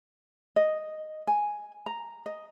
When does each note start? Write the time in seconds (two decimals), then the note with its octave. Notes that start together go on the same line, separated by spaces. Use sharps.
0.56 D#5
1.27 G#5
1.86 A#5
2.26 D#5